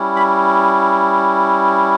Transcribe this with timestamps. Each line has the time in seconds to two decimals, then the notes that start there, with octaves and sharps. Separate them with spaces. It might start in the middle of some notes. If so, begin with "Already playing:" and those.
Already playing: G3 C#4 E4
0.16 B5